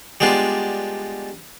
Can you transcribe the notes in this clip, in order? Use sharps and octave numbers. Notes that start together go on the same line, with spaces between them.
G3 G#3 B3 D4 F4